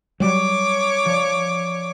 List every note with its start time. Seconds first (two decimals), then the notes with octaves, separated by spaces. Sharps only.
0.20 F#3 G3 C#5 D6
1.05 F3 D5